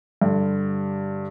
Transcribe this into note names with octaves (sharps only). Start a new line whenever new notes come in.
G2 D3